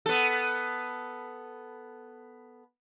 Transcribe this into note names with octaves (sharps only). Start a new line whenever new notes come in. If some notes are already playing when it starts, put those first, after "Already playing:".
B3 A4